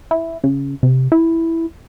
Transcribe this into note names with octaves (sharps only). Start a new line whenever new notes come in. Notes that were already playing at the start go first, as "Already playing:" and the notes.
E4
C#3
C3
E4